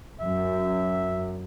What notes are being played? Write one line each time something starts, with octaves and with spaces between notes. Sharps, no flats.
F#2 E5